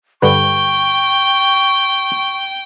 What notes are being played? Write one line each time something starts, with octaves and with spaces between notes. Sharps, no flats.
G2 D3 B4 G5 C#6